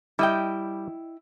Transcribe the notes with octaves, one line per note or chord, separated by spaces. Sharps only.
G3 E4 D#5 G5